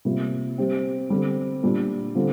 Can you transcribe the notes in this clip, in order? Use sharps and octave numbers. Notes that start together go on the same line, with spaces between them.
C3 G3 A#3 F4
G3 C4 G4
D3 G3 C4 G4
A#2 G3 D4
D3 G3 C4 F4